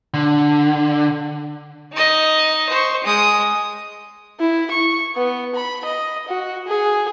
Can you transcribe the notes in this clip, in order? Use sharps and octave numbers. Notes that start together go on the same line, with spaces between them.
D3
D#4 D#5
C5 C#6
G#3 D#6
E4
C#6
B3
B5
D#5
F#4
G#4